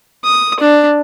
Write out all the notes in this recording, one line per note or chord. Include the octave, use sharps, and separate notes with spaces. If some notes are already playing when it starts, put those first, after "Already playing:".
D#6
D4